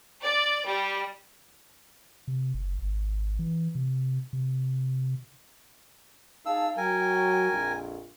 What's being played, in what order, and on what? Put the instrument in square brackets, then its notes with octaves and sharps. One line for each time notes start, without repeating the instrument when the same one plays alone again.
[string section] D5
G3
[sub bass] C3
F#1
G#1
E3
C3
C3
[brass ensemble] D#4 G#4 A5 [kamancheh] F5 [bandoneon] E6
[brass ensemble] F#3 [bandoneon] A#4 G#5 [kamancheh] G5
[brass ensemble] A#1 F2